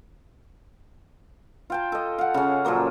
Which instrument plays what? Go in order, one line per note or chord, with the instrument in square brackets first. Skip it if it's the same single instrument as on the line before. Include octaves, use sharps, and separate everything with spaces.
[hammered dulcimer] F4 G5 A5
A4 D#5
F5 F#5
C#3 C#4
A#2 F3 F#3 A#3